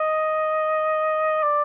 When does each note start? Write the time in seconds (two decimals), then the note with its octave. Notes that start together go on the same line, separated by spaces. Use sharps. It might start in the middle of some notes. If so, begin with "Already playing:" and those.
Already playing: D#5
1.43 D5